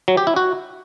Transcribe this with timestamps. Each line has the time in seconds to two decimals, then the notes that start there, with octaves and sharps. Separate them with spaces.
0.08 F#3
0.17 G4
0.27 E4
0.36 F#4